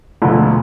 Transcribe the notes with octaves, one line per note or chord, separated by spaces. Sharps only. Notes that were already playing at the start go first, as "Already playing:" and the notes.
E1 D2 D3 F3 A3